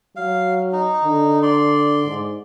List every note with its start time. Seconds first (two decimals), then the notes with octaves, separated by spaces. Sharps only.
0.16 F#3 F5
0.73 D#4
1.04 D3
1.43 D5 C6
2.06 G#2